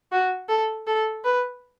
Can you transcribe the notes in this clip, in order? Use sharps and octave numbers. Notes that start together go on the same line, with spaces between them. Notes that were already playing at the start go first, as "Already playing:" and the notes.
F#4
A4
A4
B4